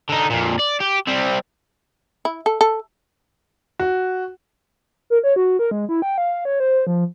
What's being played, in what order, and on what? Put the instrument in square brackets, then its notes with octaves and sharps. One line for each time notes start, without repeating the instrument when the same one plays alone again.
[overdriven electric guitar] D3 D#4
F2 A#2
D5
G4
G3 C4
[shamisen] E4
A4
A4
[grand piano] F#4
[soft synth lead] A#4
C#5
F#4
A#4
G#3
E4
G5
F5
C#5
C5
F3